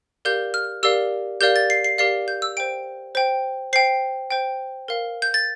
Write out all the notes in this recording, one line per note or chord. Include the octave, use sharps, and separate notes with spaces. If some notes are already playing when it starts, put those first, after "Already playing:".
G4 A#4 D5 F5 G6
F6
G4 A#4 D5 F5 E6
G4 A#4 D5 F5 G6
A6
C7
C7
G4 A#4 D5 F5 C7
G6
E6
C5 G5 D7
C5 G5
C5 G5 C7
C5 G5
A#4 F5
G6
A6